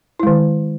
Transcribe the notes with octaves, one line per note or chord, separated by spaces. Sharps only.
D#3 G#3 E4